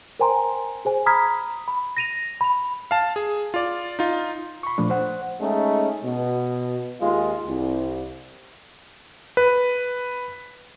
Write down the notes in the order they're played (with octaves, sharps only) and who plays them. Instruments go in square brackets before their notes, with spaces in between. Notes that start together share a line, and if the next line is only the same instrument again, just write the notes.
[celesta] A#4 C5 G5 G#5 A#5 C6
G#4 C5 G#5
A#5 B5 D#6 F6 G#6 B6
B5
A#6 D#7 F7
B5 F7
[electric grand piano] F5 A5
G#4
F4 D5
D#4 F4
[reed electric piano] B5 C#6
A#2 F3 A3 D4
C5 F#5
[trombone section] G#3 A3 C#4 D#4
B2
D#2 G#3 F4
C2
[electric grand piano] B4